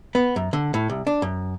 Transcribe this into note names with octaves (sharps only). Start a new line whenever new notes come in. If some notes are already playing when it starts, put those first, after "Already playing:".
B3
F#2
D3
A2
C2
D4
F#2